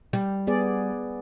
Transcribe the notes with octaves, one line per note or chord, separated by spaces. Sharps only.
G3
B3 G#4 D5